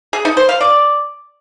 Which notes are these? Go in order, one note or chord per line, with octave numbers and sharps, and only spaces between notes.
G#4
D#4
C5
F5
D5